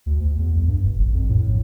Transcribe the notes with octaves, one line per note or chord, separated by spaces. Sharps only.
D2
D2
E2
C2
G2
E1
A1
F2
A2
A#1